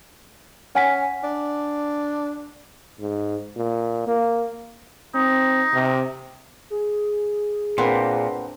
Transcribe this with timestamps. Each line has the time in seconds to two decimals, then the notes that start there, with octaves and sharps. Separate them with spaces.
0.75 C#4 F#5 G#5 B6
1.24 D4
3.00 G#2
3.56 A#2
4.07 A#3
5.15 C4 D#4
5.73 C3
6.70 G#4
7.78 A#2 C4 D4 A#4 B4 F#5 C6